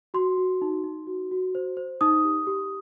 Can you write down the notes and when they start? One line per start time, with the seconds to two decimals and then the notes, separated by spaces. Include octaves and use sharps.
0.14 F#4 C6
0.38 F#4
0.62 D#4
0.84 D#4
1.07 F#4
1.31 F#4
1.55 C5
1.77 C5
2.01 D#4 D#6
2.24 G4
2.47 G4